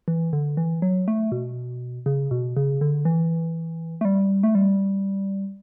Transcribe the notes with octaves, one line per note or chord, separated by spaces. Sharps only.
E3
D3
E3
F#3
A3
B2
C#3
B2
C#3
D3
E3
A3
G3
A3
G3